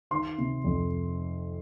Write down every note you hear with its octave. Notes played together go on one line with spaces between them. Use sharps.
D#3 C6
C3
F2